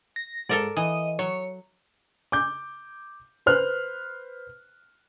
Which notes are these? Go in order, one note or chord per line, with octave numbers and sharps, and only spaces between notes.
A#6
G#2 A4 A#4 D5
E3 D#5
F#3 C#5
D6 G6
B4 C5 F6 F#6